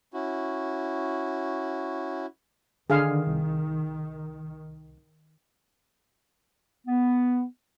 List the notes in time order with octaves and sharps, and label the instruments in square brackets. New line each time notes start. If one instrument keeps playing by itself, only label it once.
[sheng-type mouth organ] C#4 E4 F#4
[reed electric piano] D3 [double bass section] D#3 [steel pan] G#4 F5
[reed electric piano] C2
[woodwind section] B3